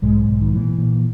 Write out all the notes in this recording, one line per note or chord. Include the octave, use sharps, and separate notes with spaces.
B1 G#2 G#3
B1
D#3
A#2 E3
A#2